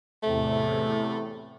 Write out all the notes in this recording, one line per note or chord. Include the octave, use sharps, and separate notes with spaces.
E2 A2 C3 A3